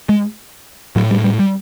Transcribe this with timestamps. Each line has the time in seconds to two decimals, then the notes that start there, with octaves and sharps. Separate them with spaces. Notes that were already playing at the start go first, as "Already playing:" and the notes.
0.09 G#3
0.96 A2 F#3
1.11 G3
1.24 G3
1.39 G3